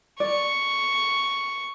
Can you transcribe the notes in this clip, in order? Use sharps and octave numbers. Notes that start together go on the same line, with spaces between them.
D5 C#6